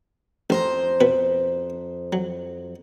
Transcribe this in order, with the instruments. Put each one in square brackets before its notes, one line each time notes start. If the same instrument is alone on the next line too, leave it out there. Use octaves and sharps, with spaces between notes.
[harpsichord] A1 [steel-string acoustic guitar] F2 C5 A#5
[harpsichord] B2 B4
F#3